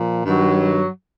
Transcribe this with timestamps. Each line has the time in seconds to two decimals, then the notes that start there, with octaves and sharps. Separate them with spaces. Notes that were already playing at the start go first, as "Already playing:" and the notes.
Already playing: A#2 F3
0.25 G2 D#3 F#3